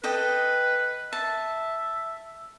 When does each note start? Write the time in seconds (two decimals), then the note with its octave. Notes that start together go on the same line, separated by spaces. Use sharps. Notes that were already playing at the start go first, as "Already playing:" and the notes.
0.03 A4 B4 D#5 G5
1.13 E5 A5